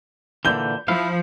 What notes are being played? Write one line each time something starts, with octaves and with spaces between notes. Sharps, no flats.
A#2 D3 E3 G6 G7
F3 E4 F5